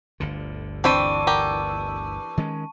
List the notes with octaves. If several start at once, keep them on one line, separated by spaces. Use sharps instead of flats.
G1 D2 D3
E3 C4 D4 G5 A5 B5 C#6 D#7
B3 G4 A#4
D#3 G#3 C#4